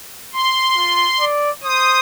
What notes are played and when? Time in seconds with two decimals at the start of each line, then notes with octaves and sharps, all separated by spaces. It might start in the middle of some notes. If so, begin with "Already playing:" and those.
0.33 C6
0.76 F4
1.20 D5
1.64 C5 D#6